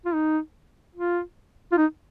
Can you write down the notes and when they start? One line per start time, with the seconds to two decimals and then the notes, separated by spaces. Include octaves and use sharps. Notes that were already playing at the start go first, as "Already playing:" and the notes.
0.05 F4
0.14 D#4
0.96 F4
1.72 F4
1.77 D#4